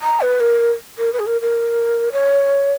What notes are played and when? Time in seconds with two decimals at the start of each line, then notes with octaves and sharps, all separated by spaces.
0.02 A#5
0.21 B4
0.40 A#4
0.98 A#4
1.13 B4
1.19 G#4
1.26 A#4
1.41 A#4
2.12 C#5